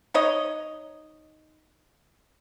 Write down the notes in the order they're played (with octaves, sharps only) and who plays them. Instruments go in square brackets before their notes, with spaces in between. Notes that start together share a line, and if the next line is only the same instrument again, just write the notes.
[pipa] D#4 C#5 D#5